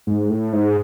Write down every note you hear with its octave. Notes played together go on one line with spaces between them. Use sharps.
G#2
A2
G#2